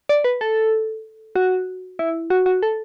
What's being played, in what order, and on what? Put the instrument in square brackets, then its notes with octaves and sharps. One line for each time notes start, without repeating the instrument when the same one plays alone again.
[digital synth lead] D5
B4
A4
F#4
E4
F#4
F#4
A4